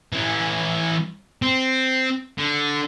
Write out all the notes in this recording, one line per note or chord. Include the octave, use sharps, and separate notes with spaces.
E3 C#4
C4
D3